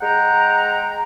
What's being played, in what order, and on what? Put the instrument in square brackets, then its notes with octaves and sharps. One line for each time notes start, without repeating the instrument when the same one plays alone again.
[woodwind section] G#3 F#5 G5 A#5